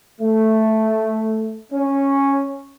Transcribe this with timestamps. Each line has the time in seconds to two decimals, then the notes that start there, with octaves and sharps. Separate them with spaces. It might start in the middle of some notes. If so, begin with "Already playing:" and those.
0.20 A3
1.72 C#4